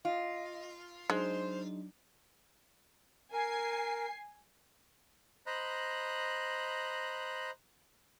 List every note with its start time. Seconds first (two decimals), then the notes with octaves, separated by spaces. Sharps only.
0.05 F4 D#5
1.10 F#3 G#3 D4 D#4 C5
3.33 A#4 G#5 C7
5.46 C5 D#5 A#5 B5 F#6